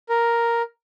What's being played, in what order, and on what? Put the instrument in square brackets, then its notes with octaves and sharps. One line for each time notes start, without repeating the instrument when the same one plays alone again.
[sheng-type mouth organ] A#4